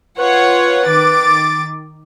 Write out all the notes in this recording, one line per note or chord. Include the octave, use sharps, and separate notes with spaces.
F4 B4 C#5 F#5
D#3 D6 A6